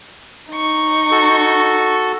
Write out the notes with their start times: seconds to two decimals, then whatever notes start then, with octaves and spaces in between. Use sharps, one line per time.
0.51 D#4 C#6
1.11 F#4 A4